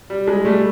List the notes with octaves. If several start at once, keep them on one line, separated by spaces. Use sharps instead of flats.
G3
G#3
G3 A3